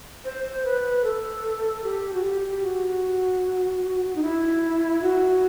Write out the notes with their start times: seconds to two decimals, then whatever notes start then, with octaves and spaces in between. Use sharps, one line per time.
0.25 C5
0.64 B4
1.04 A4
1.84 G4
2.14 F#4
2.24 G4
2.64 F#4
4.15 D#4
4.23 E4
5.02 F#4